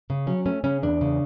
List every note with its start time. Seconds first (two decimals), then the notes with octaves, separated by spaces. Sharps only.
0.10 C#3
0.27 F#3 C#4
0.46 A3 C#4
0.64 C#3 C#4
0.83 E2 D4
1.01 C#3